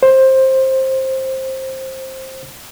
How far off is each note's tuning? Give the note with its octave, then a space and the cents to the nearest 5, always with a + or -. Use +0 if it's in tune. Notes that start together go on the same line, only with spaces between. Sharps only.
C5 +15